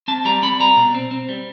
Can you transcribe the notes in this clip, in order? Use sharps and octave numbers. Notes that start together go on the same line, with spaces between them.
C4 A5
G3 A#5
C4 B5
G3 A#5
B2
C4
C4
G3